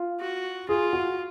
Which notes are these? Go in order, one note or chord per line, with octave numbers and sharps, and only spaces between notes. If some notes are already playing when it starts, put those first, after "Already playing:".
Already playing: F4
F#4
F4 G#4
F#4